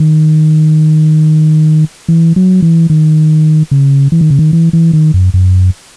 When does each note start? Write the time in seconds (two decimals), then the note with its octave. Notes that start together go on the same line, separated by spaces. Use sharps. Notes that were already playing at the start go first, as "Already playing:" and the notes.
Already playing: D#3
2.08 E3
2.36 F#3
2.62 E3
2.90 D#3
3.71 C#3
4.12 E3
4.21 D#3
4.30 C#3
4.39 D#3
4.53 E3
4.73 E3
4.93 D#3
5.14 F#2
5.34 F#2